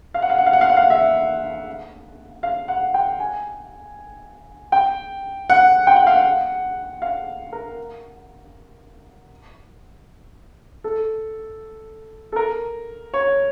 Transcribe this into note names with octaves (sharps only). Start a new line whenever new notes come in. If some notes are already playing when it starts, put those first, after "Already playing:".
F5
F#5
F5
F#5
F5
F#5
F5
F#5
F5
E5
F5
F#5
G5
G#5
G5
F#5
G5
F#5
F5
F#5
F5
A#4
A4
A4
A#4
C#5